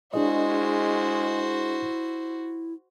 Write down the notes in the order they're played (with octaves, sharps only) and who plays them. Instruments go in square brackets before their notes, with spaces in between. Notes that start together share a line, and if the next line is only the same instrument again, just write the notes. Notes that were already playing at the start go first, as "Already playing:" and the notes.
[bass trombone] G#3 [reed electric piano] D4 G#4 D#5 [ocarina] E4 [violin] F#4 C5